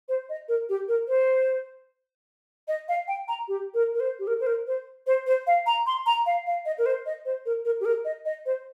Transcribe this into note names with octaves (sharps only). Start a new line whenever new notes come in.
C5
D#5
A#4
G4
A#4
C5
D#5
F5
G5
A#5
G4
A#4
A#4
C5
G4
A#4
C5
A#4
C5
C5
C5
F5
A#5
C6
A#5
F5
F5
D#5
A#4
C5
D#5
C5
A#4
A#4
G4
A#4
D#5
D#5
C5